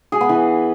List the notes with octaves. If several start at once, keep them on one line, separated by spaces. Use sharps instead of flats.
G#4
B3
E3